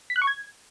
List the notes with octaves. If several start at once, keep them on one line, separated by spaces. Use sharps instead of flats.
B6
F#6
C#6
G#6